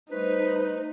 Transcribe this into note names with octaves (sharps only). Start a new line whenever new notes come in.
G3 A3 D#4 B4 C5